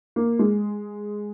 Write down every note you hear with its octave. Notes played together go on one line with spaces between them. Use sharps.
A#3
G#3